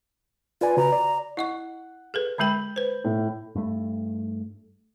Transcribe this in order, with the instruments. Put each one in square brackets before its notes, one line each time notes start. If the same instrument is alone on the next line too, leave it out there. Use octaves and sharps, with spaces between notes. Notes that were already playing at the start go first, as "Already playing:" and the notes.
[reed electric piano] F4 B4 G#5 [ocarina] D5
[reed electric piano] C#3 F#4 B4 [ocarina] A#5
[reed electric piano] D5
[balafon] E4 D#5 C#6 [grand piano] F#5
[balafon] G#4 A4 B4
[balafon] D3 G#3 G5 [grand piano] B5 G6 F#7
[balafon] B4 C5
[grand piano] A2
[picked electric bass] G2 A3